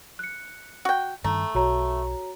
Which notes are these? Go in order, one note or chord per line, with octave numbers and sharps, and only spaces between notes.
F#6 C#7
F#4 G5
G2 D#3 A3 A#5
B1 F#4 C#5 A#5